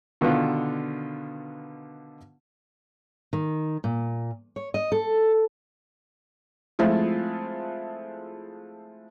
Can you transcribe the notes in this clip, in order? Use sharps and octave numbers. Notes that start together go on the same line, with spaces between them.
B2 D3 D#3 B3 D4 F4
D#3
A#2
C#5
D#5
A4
F3 G#3 A3 C4 E4 F4